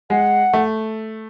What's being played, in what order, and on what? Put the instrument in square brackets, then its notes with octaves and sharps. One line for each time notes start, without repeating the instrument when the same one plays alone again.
[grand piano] G#3 [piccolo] F#5
[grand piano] A3